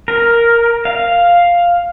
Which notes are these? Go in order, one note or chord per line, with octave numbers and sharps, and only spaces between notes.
A#4
F5